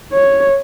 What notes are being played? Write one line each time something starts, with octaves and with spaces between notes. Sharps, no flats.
C#5